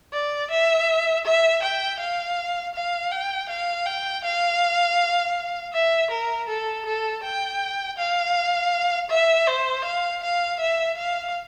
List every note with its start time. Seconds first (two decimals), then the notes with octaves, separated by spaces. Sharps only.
0.13 D5
0.51 E5
1.25 E5
1.63 G5
2.00 F5
2.74 F5
3.11 G5
3.49 F5
3.86 G5
4.24 F5
5.73 E5
6.10 A#4
6.48 A4
6.86 A4
7.23 G5
7.98 F5
9.10 E5
9.47 C5
9.84 F5
10.23 F5
10.60 E5
10.97 F5